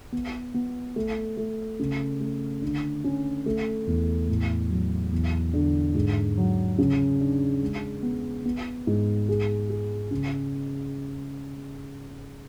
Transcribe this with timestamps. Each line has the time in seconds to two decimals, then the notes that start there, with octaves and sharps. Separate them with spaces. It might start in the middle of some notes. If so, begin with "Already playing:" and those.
0.12 B3
0.54 B3
0.96 A3
1.37 A3
1.80 C#3
2.20 A3
2.62 D3
3.04 C#4
3.46 A3
3.87 E2
4.28 A2
4.70 F#3
5.12 E2
5.54 D3
5.95 G#2
6.38 F#3
6.78 C#3
7.21 D4
7.62 G#3
8.03 B3
8.45 B3
8.87 G#2
9.29 G#4
9.70 G#4
10.11 C#3